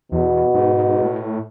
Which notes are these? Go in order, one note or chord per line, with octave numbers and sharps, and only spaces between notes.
E2 B2
G#2
A2